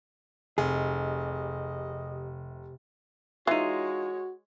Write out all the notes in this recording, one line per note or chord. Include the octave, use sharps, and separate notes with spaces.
F1 C3 G#4 D#5
E3 G#3 D#4 F4 F#4 C#5